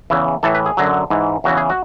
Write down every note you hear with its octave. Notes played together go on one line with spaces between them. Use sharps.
E2 C#3 E3
A2 E3 A4
B4
G#4
F#2 D3 F#3
G#2 E3
E2 C#3 E3 F#4
G#4
F#4